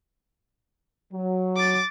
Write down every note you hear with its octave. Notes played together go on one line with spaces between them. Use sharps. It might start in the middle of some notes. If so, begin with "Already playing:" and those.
F#3
D6 A6